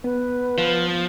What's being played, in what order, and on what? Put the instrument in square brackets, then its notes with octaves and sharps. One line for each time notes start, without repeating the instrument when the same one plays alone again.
[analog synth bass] B3 [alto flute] B4
[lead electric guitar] F3